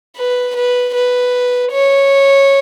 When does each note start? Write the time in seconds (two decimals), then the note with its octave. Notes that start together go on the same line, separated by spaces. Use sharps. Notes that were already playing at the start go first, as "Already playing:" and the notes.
0.17 B4
0.55 B4
0.94 B4
1.72 C#5